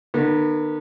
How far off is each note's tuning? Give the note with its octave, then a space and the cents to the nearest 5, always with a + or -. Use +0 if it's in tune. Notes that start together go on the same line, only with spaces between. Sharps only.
D#3 -45 B3 -25